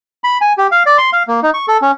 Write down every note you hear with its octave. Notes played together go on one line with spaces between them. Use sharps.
B5
G#5
G4
F5
D5
C6
F5
A#3
D#4
C#6
A4
C#4